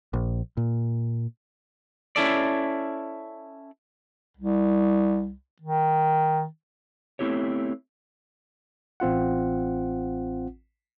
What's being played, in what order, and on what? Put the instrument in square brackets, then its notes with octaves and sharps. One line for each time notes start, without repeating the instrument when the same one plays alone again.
[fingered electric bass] A#1
A#2
[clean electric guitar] C#4 E4 A4 D5
[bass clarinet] C2
D#3
[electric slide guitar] A3 B3 C4 E4 G4 C#5
[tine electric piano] A1 C4 F4 F#5